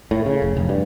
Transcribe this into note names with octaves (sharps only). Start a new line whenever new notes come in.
A2
C#3
F1
F1
G2